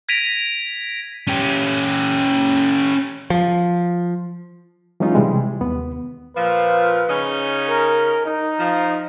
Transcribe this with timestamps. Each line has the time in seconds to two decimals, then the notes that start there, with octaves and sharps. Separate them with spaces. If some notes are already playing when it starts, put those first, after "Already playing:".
0.09 G#6 A#6 B6 D7 D#7 F7
1.27 C#4 G4
3.30 F3
5.00 E3 F#3 G#3 C#4 D#4 F4
5.15 C3 E3 G3 G#3
5.61 D#2 B3
6.36 A#2 F3 B4
7.08 C#3 C#4 D#4
7.69 A#4
8.25 D#4
8.58 F3